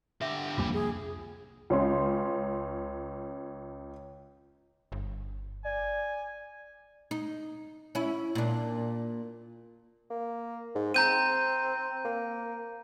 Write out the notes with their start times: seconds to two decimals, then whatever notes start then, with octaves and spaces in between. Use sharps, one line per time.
0.22 D3 G4 E5
0.58 C2 F2 A#3 D4 F4
0.73 G#4
1.70 C#2 C#4 C6
4.92 G1
5.65 D5 G#5
7.11 D#4
7.95 C#4 E4
8.35 A#2 D4
10.10 A#3
10.75 G#2
10.94 C4 A#5 G6 D#7
12.05 A#3